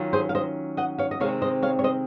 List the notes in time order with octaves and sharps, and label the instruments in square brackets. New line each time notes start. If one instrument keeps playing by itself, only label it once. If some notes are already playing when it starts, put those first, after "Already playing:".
Already playing: [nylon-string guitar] D#3 F#3 C#4 F4
G#4 C5
F5
C5 D#5
D#5 F#5
C#5 F5
D#5
C3 D#3 G#3 C4 C#5 F5
C5 D#5
C#5 F5
C#5
C5 D#5